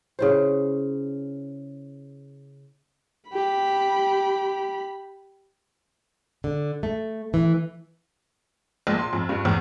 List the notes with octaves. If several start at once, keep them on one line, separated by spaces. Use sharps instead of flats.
C#3 E4 C5
G4 B5
D3
A3
E3
A#1
C6
F2
G2
E2